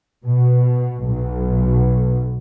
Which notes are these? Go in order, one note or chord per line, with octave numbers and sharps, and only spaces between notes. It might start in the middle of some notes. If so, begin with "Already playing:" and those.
B2
B1